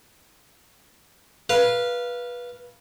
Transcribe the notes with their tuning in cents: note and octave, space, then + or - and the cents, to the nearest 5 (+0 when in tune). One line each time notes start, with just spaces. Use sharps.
B4 -20 F5 -10